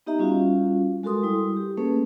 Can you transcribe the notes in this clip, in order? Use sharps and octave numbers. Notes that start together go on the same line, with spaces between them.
B3 D#4 G4 D#5 E5 A#5
G3 C#4 F4 F#4 F5
G#3 F#4 A4 A#4 C6 D#6
G3 E4 D#6
G4
A3 A#3 C#4 G#4 A4 B4